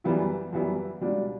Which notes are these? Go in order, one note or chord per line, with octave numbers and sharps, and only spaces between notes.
F#2 E3 G3 B3 E4
F#2 E3 G3 B3 E4
C#2 B2 G3 D4